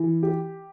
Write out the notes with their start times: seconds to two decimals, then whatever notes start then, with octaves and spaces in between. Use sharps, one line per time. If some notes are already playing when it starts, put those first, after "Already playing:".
Already playing: E3
0.23 G4